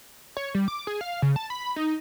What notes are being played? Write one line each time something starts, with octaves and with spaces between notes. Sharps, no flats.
C#5
G3
D6
G#4
F5
C#3
A5
B5
D#4